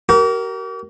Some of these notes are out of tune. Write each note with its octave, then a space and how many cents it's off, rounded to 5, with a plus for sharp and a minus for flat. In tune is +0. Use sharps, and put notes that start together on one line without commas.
G4 -45 A#4 +0